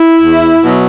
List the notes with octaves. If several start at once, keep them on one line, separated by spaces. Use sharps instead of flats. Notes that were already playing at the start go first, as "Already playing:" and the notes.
Already playing: E4
E2
B2 F#3